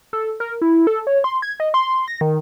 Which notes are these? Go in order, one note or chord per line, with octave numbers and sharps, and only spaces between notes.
A4
A#4
E4
A4
C#5
C6
G#6
D#5
C6
A#6
D#3